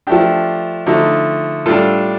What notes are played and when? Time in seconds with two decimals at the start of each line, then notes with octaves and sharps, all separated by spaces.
0.07 F3 A3 D4 G4
0.86 D3 F3 A3 D#4
1.66 A2 G3 D4 F4 A4